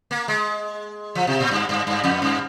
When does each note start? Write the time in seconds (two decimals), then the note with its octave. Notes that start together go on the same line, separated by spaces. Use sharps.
0.11 A#3
0.28 G#3
1.15 F3
1.27 C3
1.40 A#2
1.51 G2
1.69 G2
1.87 G2
2.04 F2
2.22 G2